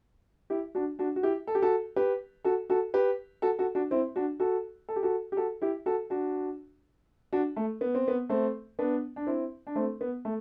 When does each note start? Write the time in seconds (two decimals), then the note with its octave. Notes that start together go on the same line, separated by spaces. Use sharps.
0.50 E4 G4
0.75 D4 F#4
0.99 D4 F#4
1.16 F#4
1.23 E4 G4
1.47 A4
1.55 G4
1.62 F#4 A4
1.96 G4 B4
2.44 F#4 A4
2.70 F#4 A4
2.94 G4 B4
3.42 F#4 A4
3.59 F#4 A4
3.75 D4 F#4
3.91 C4 E4
4.16 D4 F#4
4.40 F#4 A4
4.89 A4
4.96 G4
5.03 F#4 A4
5.32 G4
5.37 F#4 A4
5.62 E4 G4
5.86 F#4 A4
6.10 D4 F#4
7.33 D4 F#4
7.56 A3
7.81 B3
7.95 C4
8.08 B3
8.29 A3 C4
8.79 B3 D4
9.16 D4
9.27 C4 E4
9.67 D4
9.75 A3 C4
10.01 B3
10.25 A3